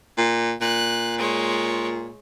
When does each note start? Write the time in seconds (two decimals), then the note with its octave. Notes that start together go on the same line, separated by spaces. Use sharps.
0.18 A#2
0.61 A#2 F#6
1.18 G#3 C#5